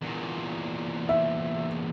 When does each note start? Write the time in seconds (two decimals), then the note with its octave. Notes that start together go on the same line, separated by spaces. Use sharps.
0.02 E2 A#2
1.09 E5